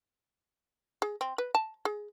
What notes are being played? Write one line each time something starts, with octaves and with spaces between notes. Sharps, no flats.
G#4
C4
B4
A5
G#4